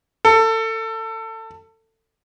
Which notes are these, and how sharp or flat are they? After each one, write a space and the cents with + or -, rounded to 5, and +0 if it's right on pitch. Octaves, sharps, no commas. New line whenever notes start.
A4 +25